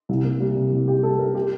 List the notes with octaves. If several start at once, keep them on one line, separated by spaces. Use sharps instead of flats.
C2
A#3
G3
C3
C2
A#3 G4
G3 A4
C3 A#4
G4